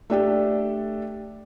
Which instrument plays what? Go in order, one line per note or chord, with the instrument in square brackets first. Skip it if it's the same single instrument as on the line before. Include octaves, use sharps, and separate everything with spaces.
[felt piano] A3 D4 G4 A4